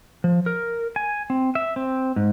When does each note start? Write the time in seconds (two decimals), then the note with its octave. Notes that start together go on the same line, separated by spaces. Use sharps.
0.24 F3
0.46 A#4
0.96 G#5
1.30 C4
1.55 E5
1.76 C4
2.16 G#2